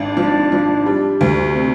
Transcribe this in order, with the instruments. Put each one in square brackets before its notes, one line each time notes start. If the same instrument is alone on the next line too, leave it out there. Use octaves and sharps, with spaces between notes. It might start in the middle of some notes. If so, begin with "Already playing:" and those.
Already playing: [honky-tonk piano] G#1 [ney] D4
[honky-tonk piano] F3
F3
G3
D2
C3